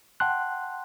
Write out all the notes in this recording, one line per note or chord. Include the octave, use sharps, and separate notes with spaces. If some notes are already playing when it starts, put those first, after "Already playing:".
F#5 G5 A5 C6 F#6